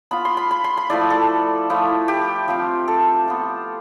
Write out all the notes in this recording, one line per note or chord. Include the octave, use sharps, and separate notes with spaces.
B3 F4 B5
C6
B5
B5
C6
B5
F3 A3 E4 D5
A4
F3 A3 E4
G4
F3 C4 F4
A4
B3 F4